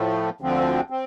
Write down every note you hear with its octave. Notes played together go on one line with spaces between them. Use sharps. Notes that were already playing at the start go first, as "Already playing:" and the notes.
Already playing: A2 F3 A3
D2 D3 F3 C4
C4